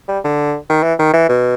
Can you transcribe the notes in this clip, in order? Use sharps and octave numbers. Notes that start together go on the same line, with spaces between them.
G3
D3
D#3
E3
D#3
E3
B2